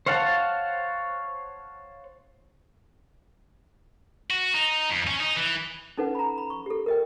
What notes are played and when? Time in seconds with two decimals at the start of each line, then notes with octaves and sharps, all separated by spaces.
0.06 C5 C#5 F5 F#5 A5
4.30 F#4
4.54 D#4
4.90 F2
5.07 C#4
5.20 D#4
5.36 E3
5.97 C#4 D#4 A4 B4 F#5
6.15 A#5 B5
6.38 B5
6.50 C#6
6.66 G4 A4
6.86 A#4 D#5 G5